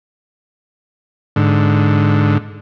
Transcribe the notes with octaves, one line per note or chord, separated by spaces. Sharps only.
G#2 D3